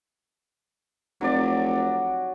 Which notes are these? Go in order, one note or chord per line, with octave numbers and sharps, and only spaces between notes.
F1 F#3 D5